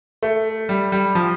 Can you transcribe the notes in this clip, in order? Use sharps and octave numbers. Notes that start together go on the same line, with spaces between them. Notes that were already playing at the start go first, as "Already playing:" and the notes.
A3
G3
G3
F3